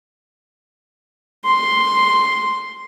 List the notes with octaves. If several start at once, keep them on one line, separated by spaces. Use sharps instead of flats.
C6